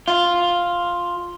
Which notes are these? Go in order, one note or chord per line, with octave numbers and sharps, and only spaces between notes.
F4